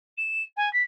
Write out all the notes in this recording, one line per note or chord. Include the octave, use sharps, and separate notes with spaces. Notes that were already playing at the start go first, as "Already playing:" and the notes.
E7
G#5
B6